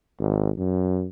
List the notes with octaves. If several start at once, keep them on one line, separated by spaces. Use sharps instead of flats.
G#1
F#2